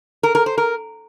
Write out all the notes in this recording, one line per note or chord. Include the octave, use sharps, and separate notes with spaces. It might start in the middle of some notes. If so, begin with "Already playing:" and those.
A#4
A#4
C5
A#4